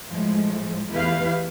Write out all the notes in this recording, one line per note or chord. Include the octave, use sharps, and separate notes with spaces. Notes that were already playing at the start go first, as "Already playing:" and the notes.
A2 F3 G#3
E2 A3 E4 G4 B4 F5